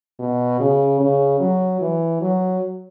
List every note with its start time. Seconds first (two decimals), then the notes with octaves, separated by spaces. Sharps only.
0.20 B2
0.60 C#3
1.00 C#3
1.40 F#3
1.81 E3
2.22 F#3